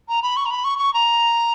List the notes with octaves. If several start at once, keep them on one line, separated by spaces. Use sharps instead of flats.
A#5
B5
C#6
A#5
B5
C#6
C#6
A#5